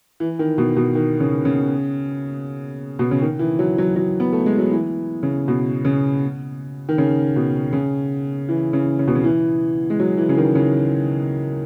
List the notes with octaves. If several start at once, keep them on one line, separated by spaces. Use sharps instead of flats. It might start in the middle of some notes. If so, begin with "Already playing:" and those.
E3
D#3
B2
B2
D#3
C#3
C#3
B2
C#3
D#3
E3
F#3
F#3
F#3
B3
A3
G#3
F#3
E3
C#3
B2
C#3
D#3
C#3
B2
C#3
E3
C#3
C#3
B2
C#3
E3
G#3
F#3
E3
C#3
D#3
C#3